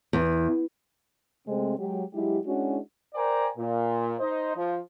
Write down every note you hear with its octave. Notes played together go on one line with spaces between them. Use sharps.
E2
C3 G#3 A3 C4
F#3 G#3 G4
F#3 G#3 E4 G4
G#3 C#4 D4 E4 F#4
A#4 C5 D5 G5 G#5 A#5
A#2
D#4 C5 D#5
F3